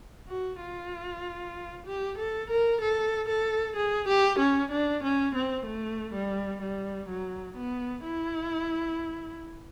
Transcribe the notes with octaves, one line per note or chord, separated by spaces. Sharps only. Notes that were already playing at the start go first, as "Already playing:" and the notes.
F#4
F4
G4
A4
A#4
A4
A4
G#4
G4
C#4
D4
C#4
C4
A3
G3
G3
F#3
B3
E4